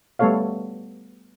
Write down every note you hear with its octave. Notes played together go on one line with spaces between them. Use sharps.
G3 A3 B3 A4 C#5 F5